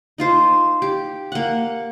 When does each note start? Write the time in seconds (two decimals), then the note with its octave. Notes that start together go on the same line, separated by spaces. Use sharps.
0.18 D#4 F4 C5
0.82 G4
1.32 A#3 F#5